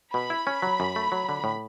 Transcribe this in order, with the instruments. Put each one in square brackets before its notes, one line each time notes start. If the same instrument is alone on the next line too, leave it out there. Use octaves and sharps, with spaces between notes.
[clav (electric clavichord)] B2 [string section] B5
[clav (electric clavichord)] E4
C#4
F#3
F#2
A3
F#3
D3
A2